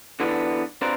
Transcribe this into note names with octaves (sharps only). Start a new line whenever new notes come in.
D3 E3 B3 D4
C4 D4 F4 A#4 B4